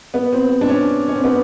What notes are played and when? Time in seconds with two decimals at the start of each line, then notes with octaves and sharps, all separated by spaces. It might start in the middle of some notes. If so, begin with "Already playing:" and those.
0.14 B3
0.33 C4
0.50 C4
0.61 D4
0.69 C#4
1.08 C#4
1.16 C4
1.24 B3